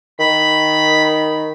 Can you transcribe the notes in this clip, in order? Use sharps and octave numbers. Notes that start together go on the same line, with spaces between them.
D#3 B5